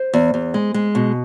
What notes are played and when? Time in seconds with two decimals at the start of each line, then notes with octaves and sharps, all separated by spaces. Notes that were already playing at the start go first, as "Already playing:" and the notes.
Already playing: C5
0.14 E2
0.34 E2
0.54 G#3
0.74 G#3
0.95 B2